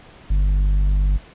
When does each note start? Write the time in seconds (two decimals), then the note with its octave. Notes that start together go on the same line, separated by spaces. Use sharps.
0.30 G1